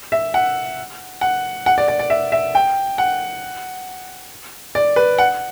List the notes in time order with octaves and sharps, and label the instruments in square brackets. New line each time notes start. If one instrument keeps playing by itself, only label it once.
[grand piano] E5
F#5
F#5
F#5
D5
D5
D5
E5
E5
G5
F#5
D5
B4
F#5